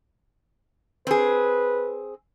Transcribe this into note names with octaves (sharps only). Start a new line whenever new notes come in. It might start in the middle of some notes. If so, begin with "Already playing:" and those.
C4 G#4 B4